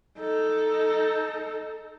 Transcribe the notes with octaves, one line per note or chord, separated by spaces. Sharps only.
D#4 A4